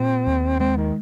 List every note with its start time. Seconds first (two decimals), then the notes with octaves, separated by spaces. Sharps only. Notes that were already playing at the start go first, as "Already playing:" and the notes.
Already playing: A#2 C4
0.27 D#2
0.60 G#3 C4
0.77 D#3